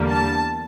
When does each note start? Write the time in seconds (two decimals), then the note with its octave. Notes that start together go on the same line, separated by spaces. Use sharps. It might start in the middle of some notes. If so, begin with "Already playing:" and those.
Already playing: E2 D3 G3 A#3
0.09 A5